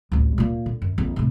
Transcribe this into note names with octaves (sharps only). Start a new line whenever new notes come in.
A1 D2
A#2 A#3
D3
F#2
A#1 F2
A2 C3